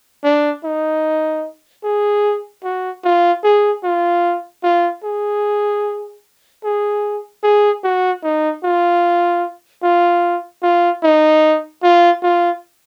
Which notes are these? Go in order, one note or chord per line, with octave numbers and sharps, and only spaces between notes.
D4
D#4
G#4
F#4
F4
G#4
F4
F4
G#4
G#4
G#4
F#4
D#4
F4
F4
F4
D#4
F4
F4